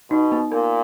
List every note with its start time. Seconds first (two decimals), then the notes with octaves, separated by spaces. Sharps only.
0.10 B2 D#4
0.32 B3
0.52 A#2 A#4